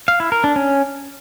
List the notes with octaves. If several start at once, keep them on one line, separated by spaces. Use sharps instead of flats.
F5
E4
A#4
D4
C#4